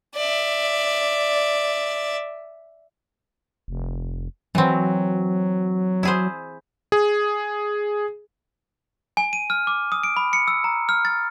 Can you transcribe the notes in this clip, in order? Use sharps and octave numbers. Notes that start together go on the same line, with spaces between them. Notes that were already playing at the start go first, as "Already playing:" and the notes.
D5 E5
F1
E3 F#3 C4
E4 G#4 C5
G#4
G#5
D#7
F6
D6
D#6
D7
B5
C#7
E6
A#5
F6
A6